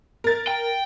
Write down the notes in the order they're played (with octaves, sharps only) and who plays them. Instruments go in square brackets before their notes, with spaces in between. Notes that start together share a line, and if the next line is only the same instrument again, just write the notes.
[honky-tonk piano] A#4 A6
[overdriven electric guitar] G5